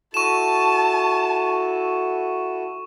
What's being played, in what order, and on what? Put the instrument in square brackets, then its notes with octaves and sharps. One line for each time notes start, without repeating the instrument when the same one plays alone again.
[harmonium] E4 F#4 A4 [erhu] A5 [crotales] C#6 E7